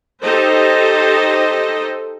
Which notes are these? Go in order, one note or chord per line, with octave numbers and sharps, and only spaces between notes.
D#4 G4 A4 C5 D#5